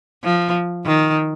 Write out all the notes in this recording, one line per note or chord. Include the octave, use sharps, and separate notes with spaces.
F3
D#3